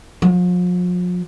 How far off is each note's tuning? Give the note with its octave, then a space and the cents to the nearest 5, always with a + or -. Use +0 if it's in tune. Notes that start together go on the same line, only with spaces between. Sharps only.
F3 +40